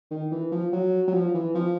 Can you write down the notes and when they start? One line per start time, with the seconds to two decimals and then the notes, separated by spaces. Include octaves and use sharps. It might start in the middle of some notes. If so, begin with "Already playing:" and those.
0.11 D#3
0.32 E3
0.52 F3
0.73 F#3
1.08 F#3
1.14 F3
1.34 E3
1.55 F3